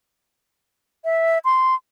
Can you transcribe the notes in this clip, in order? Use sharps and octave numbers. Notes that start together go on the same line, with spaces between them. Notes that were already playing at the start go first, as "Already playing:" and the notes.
E5
C6